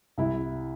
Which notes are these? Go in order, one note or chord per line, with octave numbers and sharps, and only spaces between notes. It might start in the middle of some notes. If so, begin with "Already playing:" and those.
C2 E4